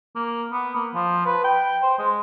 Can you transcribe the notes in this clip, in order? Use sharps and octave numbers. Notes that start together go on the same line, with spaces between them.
A#3
B3
A#3
F3
B4
G5
C5
G#3